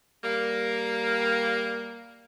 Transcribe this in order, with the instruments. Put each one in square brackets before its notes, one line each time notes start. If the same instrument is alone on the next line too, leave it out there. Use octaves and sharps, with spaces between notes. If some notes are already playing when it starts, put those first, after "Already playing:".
[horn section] G3 A#3